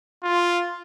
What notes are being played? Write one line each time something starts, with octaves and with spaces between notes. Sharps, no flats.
F4